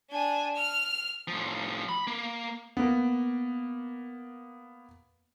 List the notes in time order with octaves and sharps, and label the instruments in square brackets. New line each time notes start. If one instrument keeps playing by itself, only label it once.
[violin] D4 G#5
F6
[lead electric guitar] A2 F3
B5
A#3
[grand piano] A#3 B3